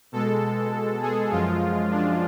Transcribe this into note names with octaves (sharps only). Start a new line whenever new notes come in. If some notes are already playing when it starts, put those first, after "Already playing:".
B2 G#3 A4
G#4
F#2 F3 G#3 F4
D4